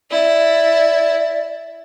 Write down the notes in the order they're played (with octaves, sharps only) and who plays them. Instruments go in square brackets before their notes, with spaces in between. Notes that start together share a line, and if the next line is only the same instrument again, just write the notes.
[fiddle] E4 [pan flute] D5